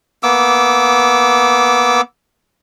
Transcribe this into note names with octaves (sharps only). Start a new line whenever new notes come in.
A#3 B3 D6 E6